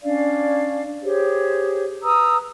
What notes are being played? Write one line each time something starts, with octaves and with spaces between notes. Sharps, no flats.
C#4 D4 D5 F5
G4 G#4 C5 C#5
B4 A#5 D#6 E6